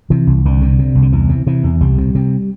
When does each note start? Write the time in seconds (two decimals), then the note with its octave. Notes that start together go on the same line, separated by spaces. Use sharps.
0.10 C3 E3
0.27 C2
0.45 C2 D3
0.62 C3
0.79 C3
0.95 C2
1.02 D3
1.12 E2 E3
1.29 C3
1.47 C3 E3
1.64 E2
1.81 C2 G3
1.98 C3
2.15 C3